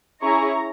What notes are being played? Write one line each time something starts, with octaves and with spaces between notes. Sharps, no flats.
C#4 E4 G#4 A#5 C#6